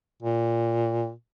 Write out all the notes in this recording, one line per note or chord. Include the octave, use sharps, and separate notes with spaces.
A#2